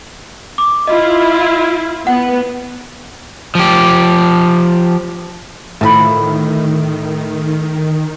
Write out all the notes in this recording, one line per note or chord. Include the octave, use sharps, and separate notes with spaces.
D6
E4 F4 D#5
B3 F#5
F3 G4
A2 D#3 F3 A4 B5